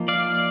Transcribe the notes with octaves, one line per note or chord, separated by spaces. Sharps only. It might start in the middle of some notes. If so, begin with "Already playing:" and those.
Already playing: F3 A#3 D#4
D5 F5